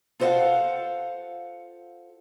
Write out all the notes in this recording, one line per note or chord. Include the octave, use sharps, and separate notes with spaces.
F4 A4 C5 D#5 F5 F#5